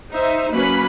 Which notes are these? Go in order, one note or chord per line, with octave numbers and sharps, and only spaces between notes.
D#4 C5 E5
F#3 A#3 C#4 B4 B5